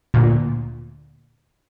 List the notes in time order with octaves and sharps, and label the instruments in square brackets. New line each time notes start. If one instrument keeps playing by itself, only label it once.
[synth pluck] D2 A#2